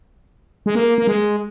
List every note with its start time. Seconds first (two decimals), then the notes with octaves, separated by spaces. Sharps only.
0.66 G#3
0.75 A#3
0.98 A#3
1.07 G#3